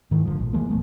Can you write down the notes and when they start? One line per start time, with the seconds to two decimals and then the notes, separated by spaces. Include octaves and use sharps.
0.11 G#2 D#3 E3
0.25 F#1 D#2 D3 F3
0.39 A#1
0.53 E3 F3 G#3 A#3
0.69 D1 A3 B3